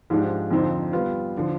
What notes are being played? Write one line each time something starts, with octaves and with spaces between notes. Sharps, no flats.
G#2 F3 G#3 D4 G4
F2 D3 F3 C4 D#4
G3 B3 F4 B4 F5
D3 F3